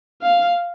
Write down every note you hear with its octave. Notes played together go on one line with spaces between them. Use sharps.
F5